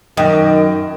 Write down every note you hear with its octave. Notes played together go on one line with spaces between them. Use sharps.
F#2 D#3 D#5 G5